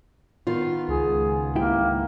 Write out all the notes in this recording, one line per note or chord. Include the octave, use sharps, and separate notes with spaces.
D#3 B3 F4
C#2 G#4
C#2 G#2 A#3 E4 G4